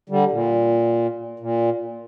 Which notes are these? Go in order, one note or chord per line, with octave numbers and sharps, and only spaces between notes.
D3 G3
A#2
A#2